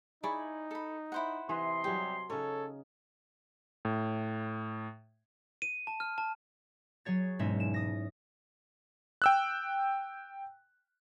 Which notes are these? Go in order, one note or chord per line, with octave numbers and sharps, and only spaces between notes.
D#4 E4 G#4 D5 B5 C#6
A4 B5
E4 C5 F#5
C3 E3 B4 D#5 C6
F#3 G3 G4 G#4
C#3 D#4 A4 C#5
A2
D#7
A5
F6
A5
F#3 G#4 C#5 A6
E1 G#2 G#3 C#4 D#5 E5
E7
D#6 A#6
G5 E6 F#6